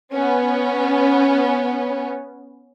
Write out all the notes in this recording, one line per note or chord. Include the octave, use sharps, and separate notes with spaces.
B3 C#4